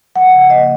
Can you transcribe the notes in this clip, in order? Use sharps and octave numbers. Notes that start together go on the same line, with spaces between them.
F3 F#5
C#3
A#3 D#5